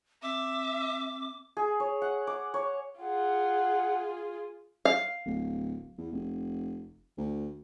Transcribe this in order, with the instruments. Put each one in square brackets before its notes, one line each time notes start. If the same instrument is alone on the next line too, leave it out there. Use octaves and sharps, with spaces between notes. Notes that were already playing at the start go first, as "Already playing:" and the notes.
[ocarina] C4 [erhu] E5 [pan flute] D6
[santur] G#4
C#5
F#5
D6
C#5
[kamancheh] F4 G#4 [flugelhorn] F#5
[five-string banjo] F5
[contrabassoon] D1
E2
F1
D2